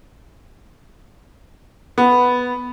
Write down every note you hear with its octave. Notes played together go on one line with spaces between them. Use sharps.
B3